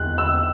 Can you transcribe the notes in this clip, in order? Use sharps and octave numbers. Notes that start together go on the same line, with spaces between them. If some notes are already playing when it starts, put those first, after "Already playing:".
Already playing: E2 F#6
E6